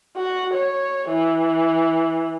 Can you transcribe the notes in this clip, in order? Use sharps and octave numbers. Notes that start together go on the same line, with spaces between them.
F#4
C#5
E3